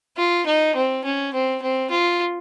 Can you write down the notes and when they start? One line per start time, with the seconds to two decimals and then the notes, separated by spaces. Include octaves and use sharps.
0.17 F4
0.46 D#4
0.75 C4
1.04 C#4
1.34 C4
1.62 C4
1.91 F4